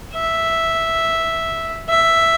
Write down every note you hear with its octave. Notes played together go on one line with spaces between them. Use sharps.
E5
E5